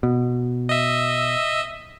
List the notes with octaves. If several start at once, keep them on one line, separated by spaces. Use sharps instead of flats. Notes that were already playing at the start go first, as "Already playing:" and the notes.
B2
D#5 E5